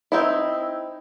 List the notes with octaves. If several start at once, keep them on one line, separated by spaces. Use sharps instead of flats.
C4 D#4 E4